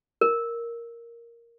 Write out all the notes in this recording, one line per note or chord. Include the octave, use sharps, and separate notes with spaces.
A#4